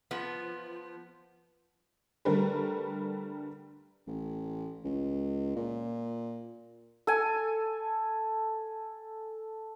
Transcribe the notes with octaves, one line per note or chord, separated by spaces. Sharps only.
F3 B3
D3 G3 A3 A#4 B4
A1
C#2
A#2
A4 G#5